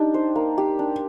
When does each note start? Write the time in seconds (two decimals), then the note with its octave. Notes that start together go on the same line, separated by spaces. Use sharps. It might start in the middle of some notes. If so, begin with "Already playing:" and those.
Already playing: D4 D#4 G4
0.14 C5
0.36 A#3
0.58 G4
0.79 D4